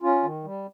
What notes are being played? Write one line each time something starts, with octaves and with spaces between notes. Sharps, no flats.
C#4 F4
D#3
G3